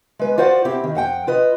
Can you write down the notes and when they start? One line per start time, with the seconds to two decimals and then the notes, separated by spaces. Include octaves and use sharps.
0.19 G#3 B4
0.38 F4 F#4 C5 D5 F#5
0.65 C4 E4 G4
0.84 D#3
0.95 F2 F#5 G5
1.27 F4 B4 D#5